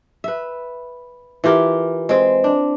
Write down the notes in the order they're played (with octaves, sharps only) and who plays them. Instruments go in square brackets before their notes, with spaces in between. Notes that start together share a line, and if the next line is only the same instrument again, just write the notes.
[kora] B4 E5
E3 F4 G4 A#4
G#3 C4
D4